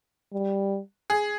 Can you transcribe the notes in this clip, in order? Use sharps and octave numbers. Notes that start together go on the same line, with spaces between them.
G3
G#4